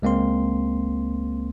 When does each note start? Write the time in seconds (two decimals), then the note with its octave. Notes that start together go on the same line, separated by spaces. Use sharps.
0.02 C#2 G#3 A#3 C4 C6